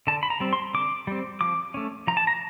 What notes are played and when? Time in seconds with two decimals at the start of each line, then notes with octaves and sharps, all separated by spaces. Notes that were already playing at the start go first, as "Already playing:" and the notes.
0.07 D3 A5
0.23 B5
0.30 A#5
0.40 G3 C4
0.53 C6
0.74 D3 D6
1.07 G3 C4
1.41 F3 D6
1.74 A3 C#4
2.07 F3 A#5
2.17 A5
2.27 A#5